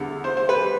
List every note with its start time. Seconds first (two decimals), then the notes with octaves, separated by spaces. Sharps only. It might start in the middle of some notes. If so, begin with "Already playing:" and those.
Already playing: E2 D3 G3
0.24 C5
0.37 C5
0.49 B4
0.62 G3